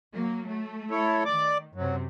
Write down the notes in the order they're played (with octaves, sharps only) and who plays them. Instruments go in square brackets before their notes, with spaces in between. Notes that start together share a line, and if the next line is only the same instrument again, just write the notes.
[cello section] F#3 A#3
A3
[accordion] E4 A4 C#5
[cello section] D#3 [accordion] D5 D6
[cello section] F#2 C3 [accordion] F#3